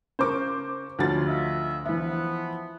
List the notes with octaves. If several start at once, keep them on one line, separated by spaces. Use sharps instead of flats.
C#3 A#4 C5 C#6 D6
D2 F3 C#4 D#4 F4 F#4 A6
F4 D#5 E5
E3 F3 B3 E5